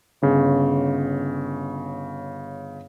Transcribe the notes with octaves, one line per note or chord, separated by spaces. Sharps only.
G1 C#3